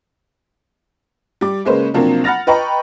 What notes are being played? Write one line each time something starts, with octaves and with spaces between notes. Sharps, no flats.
G3 D6
C#3 G#3 A#3 C#4 B4 C5
C3 F3 F#3 A#3 C4 D4
F#5 B5 F6 A6 A#6 F7
B4 D#5 G5 A#5 B5 C#6